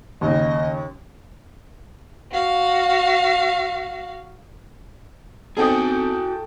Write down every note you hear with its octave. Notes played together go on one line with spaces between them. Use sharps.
D#2 C#3 D#5
F#4 F5
B3 C4 D#4 F#4 G#4 A4 G5 D#6